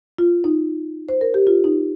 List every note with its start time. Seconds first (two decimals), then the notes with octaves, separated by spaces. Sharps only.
0.18 F4
0.44 D#4
1.09 C5
1.21 A#4
1.34 G4
1.47 F4
1.64 D#4